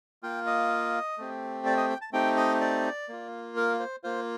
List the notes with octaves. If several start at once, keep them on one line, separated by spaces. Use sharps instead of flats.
A#3 F4 G5
D#5
A3 C4 G4
D5
D#5
G5
A5
A3 C4 D#4 G4 G5
D#5
D5
A#3 F4
A#4
C5
A#3 F4 C5